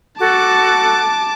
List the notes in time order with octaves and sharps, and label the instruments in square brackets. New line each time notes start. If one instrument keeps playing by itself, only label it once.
[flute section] F#4 A4 [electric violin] A5 D6